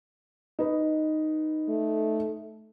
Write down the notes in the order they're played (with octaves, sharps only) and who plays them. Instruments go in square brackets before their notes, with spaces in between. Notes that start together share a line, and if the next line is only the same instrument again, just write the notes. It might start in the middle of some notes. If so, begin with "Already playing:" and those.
[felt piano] D#4 B4 D#5
[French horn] A3